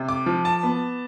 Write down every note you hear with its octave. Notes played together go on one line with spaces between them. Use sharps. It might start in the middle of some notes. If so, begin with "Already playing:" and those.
Already playing: C3
D6
F3
A5
B3